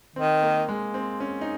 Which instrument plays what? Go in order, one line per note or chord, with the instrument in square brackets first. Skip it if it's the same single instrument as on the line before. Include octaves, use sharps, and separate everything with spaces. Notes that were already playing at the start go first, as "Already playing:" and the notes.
[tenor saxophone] D#3 [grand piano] C4
[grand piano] A#3
G#3
C4
C#4
D#4